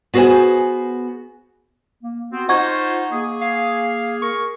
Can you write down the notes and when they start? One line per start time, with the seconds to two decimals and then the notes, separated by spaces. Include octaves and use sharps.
0.14 B3 F#4 G#4 A#4 C5 G#5
2.03 A#3
2.32 B3 C4 F#4
2.49 D#4 F4 C5 F#5 C#6 G#6
3.12 A#3 G#4
3.42 F5
4.22 A#4 C#6